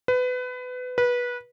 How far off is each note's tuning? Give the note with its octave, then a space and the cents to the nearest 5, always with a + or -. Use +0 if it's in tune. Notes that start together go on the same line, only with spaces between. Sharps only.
B4 +25
B4 -20